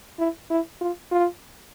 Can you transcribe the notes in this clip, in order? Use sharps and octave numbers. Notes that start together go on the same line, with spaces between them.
E4
E4
F4
F4